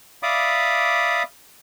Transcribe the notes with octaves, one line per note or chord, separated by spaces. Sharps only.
D5 E5 F5 B5 D6 D#6